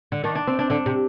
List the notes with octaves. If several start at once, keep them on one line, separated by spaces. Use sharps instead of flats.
D3
D#3 D4
D4
C4
D4
D3 D4
C3